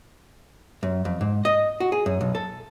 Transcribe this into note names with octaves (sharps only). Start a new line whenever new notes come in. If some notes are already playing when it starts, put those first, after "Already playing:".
F#2
F2
G#2
D#5
F#4
G#4
F#2
B1
A4